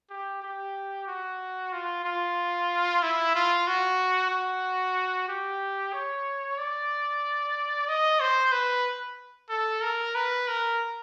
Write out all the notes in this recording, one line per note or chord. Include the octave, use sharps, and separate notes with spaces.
G4
G4
F#4
F4
F4
E4
F4
F#4
F#4
G4
C#5
D5
D#5
C5
B4
A4
A#4
B4
A#4